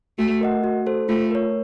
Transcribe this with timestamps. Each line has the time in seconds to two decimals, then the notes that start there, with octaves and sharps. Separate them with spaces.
0.18 A3 F#4
0.41 A#4 D#5 F#5
0.64 F#4
0.86 A4 C5
1.09 A3 F4
1.31 A#4 C#5